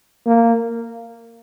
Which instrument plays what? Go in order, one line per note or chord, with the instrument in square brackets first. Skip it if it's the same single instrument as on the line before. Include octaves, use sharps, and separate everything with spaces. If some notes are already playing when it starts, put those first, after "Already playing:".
[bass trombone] A#3